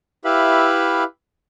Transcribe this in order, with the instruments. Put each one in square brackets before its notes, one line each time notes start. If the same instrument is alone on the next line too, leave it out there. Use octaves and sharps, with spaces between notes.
[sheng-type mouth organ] E4 G4 B4 E5 F5 B5